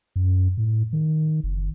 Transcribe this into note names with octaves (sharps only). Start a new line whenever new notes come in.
F#2
A2
D#3
F#1